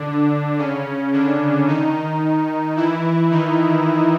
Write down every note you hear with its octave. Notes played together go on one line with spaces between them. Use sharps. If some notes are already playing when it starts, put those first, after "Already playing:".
Already playing: D3 D4
C#3 C#4
D3 D4
D#3 D#4
E3 E4
D#3 D#4